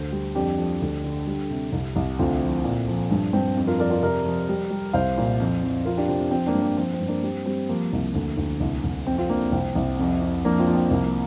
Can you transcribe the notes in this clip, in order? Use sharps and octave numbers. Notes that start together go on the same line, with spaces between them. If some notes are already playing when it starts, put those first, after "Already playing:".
Already playing: D2 C5
G3
F2 D4 G4
F3
D2
D3
G3
C3
C2
C2
D2 C4 F4
F3
A#2
F3
G2
G2 C4
F2
F4 A#4
F2 A#4 D5
F4 A#4
C3 A#4 D5
F3
G3
G3
C2 C5 F5
A#2
F2
F2
F2 F4 A#4
D4 G4
C3 C4 F4
C4
F3 C4
A#3 D4
G2
C4
F3 C4
C4
G2
A#3 D4
G3 C4
G3 C4
F3 A#3
C2
D2
D2
C2
C2
F2 C4
C4 F4
F3 A#3 D4
C2 C4
C2
F2
F2
F3 A#3 D4
C4 F4
F3
C4
C2 A#3
A#3